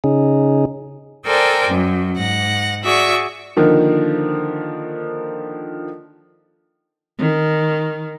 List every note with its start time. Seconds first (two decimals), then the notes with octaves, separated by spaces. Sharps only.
0.04 C#3 C#4 D#4 G#4
1.25 A4 A#4 C5 D5 G5 G#5
1.69 F#2 F#3
2.15 G#2 F#5 A#6
2.83 F#4 G#4 D5 E5 C#6
3.57 D3 D#3 F3 A#3
7.18 D#3